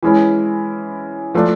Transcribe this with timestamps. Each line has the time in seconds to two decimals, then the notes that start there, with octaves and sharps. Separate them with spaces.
0.03 E3 G#3 C#4 E4
1.35 F3 A3 D4